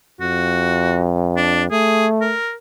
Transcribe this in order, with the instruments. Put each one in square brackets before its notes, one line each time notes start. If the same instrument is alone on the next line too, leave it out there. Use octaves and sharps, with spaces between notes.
[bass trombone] F2 [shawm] F#4
[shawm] D4
[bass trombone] A3 [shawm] G#4
[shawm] A#4